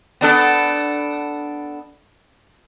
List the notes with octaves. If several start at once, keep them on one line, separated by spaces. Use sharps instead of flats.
B3 D4 A4